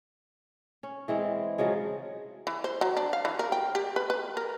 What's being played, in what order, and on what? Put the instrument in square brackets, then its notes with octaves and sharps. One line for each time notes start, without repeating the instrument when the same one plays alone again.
[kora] C#4
E3 G#3 C4
C#3 F3 F#3 G#3
[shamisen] E3
C5
F#3
D4
F5
E3
A#4
G5
G4
B4
B4
A#4